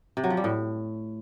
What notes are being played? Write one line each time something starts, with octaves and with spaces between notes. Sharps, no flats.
C3
F#3
F3
G3
A2